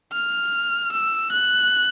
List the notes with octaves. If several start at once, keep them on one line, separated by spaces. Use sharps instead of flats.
F6
E6
F#6